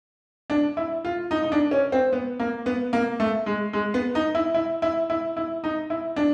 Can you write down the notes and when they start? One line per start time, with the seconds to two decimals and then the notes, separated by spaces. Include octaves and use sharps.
0.50 D4
0.77 E4
1.05 F4
1.31 D#4
1.43 D#4
1.52 D4
1.71 C#4
1.92 C4
2.13 B3
2.39 A#3
2.66 B3
2.93 A#3
3.20 A3
3.46 G#3
3.73 G#3
3.94 B3
4.15 D#4
4.35 E4
4.54 E4
4.82 E4
5.10 E4
5.36 E4
5.64 D#4
5.90 E4
6.16 D4